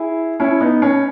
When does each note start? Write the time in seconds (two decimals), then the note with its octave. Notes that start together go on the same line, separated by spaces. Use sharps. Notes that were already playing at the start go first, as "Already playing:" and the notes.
Already playing: E4 G#4
0.40 C#4 E4
0.60 B3 D#4
0.82 C#4